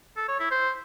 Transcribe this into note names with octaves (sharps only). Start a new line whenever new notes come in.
A4
C#5
E4
C5